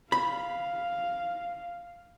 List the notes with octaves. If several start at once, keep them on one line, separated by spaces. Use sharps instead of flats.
F5 B5